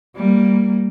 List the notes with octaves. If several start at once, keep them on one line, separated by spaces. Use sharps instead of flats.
G3 A#3